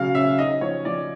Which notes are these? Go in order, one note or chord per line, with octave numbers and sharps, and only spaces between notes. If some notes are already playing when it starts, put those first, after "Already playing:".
Already playing: C#3 F#3 F5
C#4 E5
D#4 D#5
F3 C#5
F3 D5